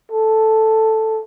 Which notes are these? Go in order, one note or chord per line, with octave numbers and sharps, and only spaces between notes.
A4